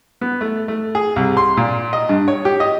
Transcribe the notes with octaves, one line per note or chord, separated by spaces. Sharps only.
B3
A3
A3
G#4
C2
C6
A#2
D#5
G2
C#5
G4
D#5